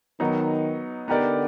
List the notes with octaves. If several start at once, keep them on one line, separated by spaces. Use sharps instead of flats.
D#3 F#3 B3 D#4
D3 B3 D#4 G4 A#4 D5